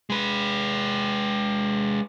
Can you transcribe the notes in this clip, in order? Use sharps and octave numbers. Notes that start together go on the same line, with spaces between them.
G#3 B4